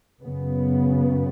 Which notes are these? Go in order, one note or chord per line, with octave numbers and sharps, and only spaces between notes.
F#2 C#3 B3